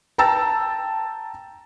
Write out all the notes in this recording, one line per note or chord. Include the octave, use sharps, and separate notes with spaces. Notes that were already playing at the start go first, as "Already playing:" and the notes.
G5 A5 A#5 E6 A6